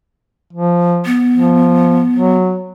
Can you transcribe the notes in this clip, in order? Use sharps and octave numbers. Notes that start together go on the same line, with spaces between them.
F3
B3
F3
F#3